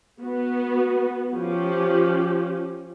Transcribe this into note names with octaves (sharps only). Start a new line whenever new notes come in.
B3 F#4
F3 C#4 G4